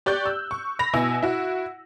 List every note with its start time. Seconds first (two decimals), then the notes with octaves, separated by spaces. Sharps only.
0.06 G4 D5 C#6 F#6 G6
0.26 E6
0.51 C#6
0.79 B5 A#6 F7
0.93 B2 E4 G#5 E6
1.23 E4 F#4